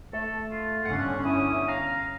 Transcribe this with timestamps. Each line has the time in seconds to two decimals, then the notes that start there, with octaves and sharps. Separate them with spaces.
0.13 A3 A4
0.51 F4
0.85 G1 D3 C#4 F#5
1.25 E4 D#6
1.68 F5 A#5